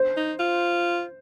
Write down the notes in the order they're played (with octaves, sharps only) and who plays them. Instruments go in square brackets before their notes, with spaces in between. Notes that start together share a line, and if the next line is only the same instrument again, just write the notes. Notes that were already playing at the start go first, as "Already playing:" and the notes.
Already playing: [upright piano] C5
[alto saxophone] D#4
F4